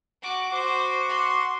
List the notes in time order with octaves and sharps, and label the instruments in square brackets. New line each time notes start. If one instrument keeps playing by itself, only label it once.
[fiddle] F#4 D6
[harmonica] F#4 D6 [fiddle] C5
[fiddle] C6